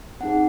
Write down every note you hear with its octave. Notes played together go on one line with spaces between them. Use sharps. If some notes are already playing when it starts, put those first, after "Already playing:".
C4 D#4 G#4 F#5